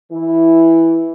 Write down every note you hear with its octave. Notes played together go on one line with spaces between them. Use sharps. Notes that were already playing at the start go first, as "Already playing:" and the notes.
E3 E4